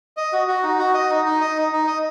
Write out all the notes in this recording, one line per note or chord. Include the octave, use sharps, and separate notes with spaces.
D#5
F#4
F#4
D#4
F#4
D#5
D#4
D#4
D#5
D#4
D#4
D#5